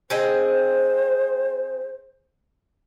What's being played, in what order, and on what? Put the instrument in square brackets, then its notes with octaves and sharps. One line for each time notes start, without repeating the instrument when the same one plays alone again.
[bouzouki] C4 G#4 D#5 [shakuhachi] C5